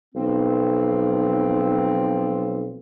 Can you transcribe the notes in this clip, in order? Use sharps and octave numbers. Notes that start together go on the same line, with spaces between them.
B1 F3 F#3 C4